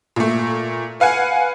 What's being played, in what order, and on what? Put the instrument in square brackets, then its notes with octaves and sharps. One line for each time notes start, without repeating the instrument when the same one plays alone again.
[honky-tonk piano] A#2 A3
B4 F5 F#5 G#5